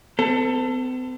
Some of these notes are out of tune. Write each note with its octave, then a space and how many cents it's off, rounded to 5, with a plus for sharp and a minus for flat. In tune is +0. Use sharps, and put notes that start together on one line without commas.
C4 -45 A4 +20